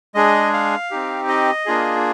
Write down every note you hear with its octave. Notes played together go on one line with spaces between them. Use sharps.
G#3 D4 G#4 D#5
F5
C4 D#4 G4
D#5
A#3 D4 F4 G#4